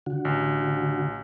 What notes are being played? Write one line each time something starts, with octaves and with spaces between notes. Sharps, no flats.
D3 F#4
A1